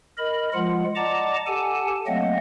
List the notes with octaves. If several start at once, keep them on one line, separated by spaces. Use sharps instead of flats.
A#4 D#5 B5
F3 G#3 F4 F#5
D5 D#5 F#5 A5 A#5 D6
G4 A4 F#5 G#5 A5
F#3 A3 A#3 C4 D#5 F#5